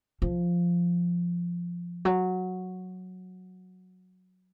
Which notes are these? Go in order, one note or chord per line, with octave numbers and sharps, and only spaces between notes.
F3
F#3